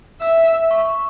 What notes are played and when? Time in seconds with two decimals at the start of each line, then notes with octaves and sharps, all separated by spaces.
0.22 E5 E6
0.71 C#6
0.87 C#6